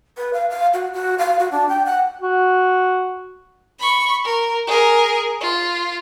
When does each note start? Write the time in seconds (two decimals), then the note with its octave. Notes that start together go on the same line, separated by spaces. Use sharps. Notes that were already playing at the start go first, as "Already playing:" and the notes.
0.18 B4
0.33 F5
0.50 F5
0.74 F#4
0.93 F#4
1.19 F5
1.39 F#4
1.52 D4
1.69 G5
1.86 F#5
2.21 F#4
3.79 B5 C#6
4.24 A#4
4.67 G#4 A#4
5.41 F4